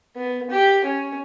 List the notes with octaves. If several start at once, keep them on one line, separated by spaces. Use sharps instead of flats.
B3
G4
C#4